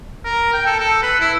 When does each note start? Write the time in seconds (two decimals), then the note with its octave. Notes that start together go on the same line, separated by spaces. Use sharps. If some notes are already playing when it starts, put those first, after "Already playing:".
0.24 A#4
0.53 G5
0.66 A4
0.80 A4
1.03 B4
1.20 E4